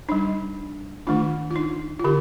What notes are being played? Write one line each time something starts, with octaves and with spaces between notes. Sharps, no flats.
G3 D4 D#4
D#3 A3 D4 F4
F4
D#4
F4
D3 G4